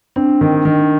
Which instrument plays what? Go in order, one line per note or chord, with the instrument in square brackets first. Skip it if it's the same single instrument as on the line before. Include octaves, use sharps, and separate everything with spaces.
[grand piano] C4 [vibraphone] D4
[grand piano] D#3
D#3